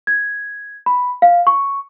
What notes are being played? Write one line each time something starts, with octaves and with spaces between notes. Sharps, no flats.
G#6
B5
F5
C#6